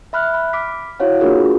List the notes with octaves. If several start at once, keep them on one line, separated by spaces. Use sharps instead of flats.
E5 B5 F6 F#6
B5
D6 F6 B6
E4 F#4 C5 C#5 F5 F#5
A#3 D4 F4 F#4 G#4 A#4